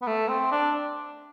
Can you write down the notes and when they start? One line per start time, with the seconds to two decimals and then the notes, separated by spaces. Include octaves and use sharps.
0.02 B3
0.07 A3
0.28 C4
0.51 D4